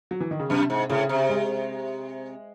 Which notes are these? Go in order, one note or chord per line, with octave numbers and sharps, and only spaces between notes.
F#3
E3
D#3
C#3
F#2 C3
G#2
A2 C#3
C3
G#3